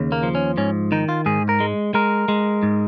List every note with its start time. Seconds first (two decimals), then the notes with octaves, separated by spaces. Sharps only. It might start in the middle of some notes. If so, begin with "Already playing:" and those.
Already playing: D#2 C#3
0.12 A#3
0.23 F3
0.35 C#4
0.57 G#2 C#4
0.92 D#3 D#4
1.09 F4
1.26 G#2 G#4
1.49 A#4
1.60 G#3
1.94 G#3 A#4
2.28 G#3
2.63 G#2